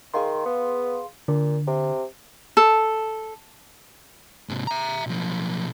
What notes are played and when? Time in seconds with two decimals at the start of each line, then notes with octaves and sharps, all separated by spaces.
0.14 D#3 G#4 F5 C6
0.46 B3
1.28 A#2 D3
1.67 C3
2.57 A4
4.49 G#2 C3
4.67 E5 A#5
5.06 B1 F3